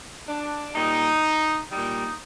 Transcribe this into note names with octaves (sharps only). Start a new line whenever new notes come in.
D4
A#2 G3 D#4
A#2 G3 D#4